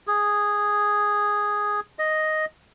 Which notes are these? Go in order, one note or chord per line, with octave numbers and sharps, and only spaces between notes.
G#4
D#5